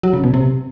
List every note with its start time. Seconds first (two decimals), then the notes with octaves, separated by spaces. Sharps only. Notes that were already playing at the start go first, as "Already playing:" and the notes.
0.03 F#3
0.14 C#3
0.24 B2
0.34 C3